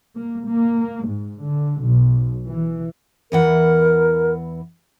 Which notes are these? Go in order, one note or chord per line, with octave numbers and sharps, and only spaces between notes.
A#3
A#3
G#2
D3
B1
E3
E2 E3 A#4 F#5